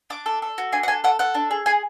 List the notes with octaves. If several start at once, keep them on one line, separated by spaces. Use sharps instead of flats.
D4 D6
A4
A4
F#4
D4 G#5
F#5
A4 G#5
A4 F#5
A4 F#5
D4
G#4
G#4 G#5